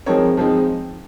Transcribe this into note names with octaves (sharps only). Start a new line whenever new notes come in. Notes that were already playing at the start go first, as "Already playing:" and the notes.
F3 G#3 C4 D#4 A#4 C#5
F3 G#3 C4 D#4